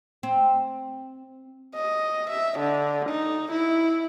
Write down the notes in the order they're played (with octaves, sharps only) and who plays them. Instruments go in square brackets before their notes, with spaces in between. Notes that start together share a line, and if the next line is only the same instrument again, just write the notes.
[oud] C4
[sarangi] D#5
E5
D3
D#4
E4